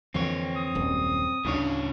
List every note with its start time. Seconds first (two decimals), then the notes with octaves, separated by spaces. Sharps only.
0.14 F2 D3 E3 C4 C#5
0.56 D#6
0.75 D#1 F#2
1.45 D2 A2 C#3 B3 D4 C#5